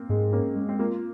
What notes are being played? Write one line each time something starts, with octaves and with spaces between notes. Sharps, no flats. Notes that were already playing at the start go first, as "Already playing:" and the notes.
Already playing: A#3 C4
G#2 G#3
A#3 C#4
G#3
C4
A#3 F4